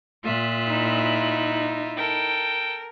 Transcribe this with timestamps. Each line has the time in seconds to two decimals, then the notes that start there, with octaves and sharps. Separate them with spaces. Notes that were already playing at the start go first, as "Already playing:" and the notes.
0.24 A#2 F4 E5 F#6
0.66 D#4 E4
1.97 A4 A#4 G5